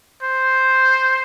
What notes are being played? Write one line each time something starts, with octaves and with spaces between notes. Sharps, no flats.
C5